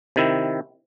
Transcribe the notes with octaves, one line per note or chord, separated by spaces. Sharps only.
C3 D#3 E4